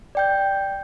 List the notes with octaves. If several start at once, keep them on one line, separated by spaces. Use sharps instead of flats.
D5 G5 G6